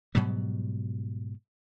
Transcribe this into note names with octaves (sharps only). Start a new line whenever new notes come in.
G#2 B2 F#3 G3